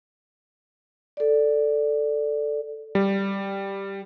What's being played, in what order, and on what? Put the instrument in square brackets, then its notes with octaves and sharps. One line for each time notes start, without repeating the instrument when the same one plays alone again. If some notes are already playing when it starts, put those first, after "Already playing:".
[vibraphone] A4 D5
[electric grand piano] G3